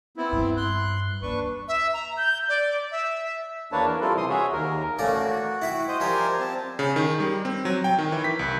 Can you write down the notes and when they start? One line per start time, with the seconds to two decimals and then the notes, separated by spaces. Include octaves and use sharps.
0.17 B3 C4 E4
0.32 G2
0.57 C6 F#6
1.22 D#2 D4 B4 C#6
1.68 E5
1.94 A#5
2.17 G6
2.49 D5
2.91 E5
3.72 E2 A#3 D4 B4 C#5 A5
3.86 A#4
4.01 G3 C4 E4 F4 A4
4.17 C3 E3 C6 D#6
4.30 F#4 G#4 C#5 E5
4.53 D#2 A#4
4.99 A1 A3 A#3 C#4 D5
5.12 F#4
5.62 E4 E5 G5
5.88 C5 D#5
6.00 F3 G3 G4 A#4 C5 G#5
6.40 C4 A5
6.79 C#3
6.96 D#3
7.20 G3
7.45 C4
7.65 F#3
7.84 G5
7.99 D#3
8.12 E3
8.24 B6
8.39 C2